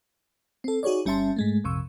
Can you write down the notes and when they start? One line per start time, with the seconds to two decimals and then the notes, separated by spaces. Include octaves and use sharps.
0.64 C4 A4
0.83 D#4 F#4 G#4 C#5 D5
1.05 G1 G3 C#4 E5 A5 C6
1.36 G#2 G#3 A3
1.64 A#1 F2 C3 C#6 E6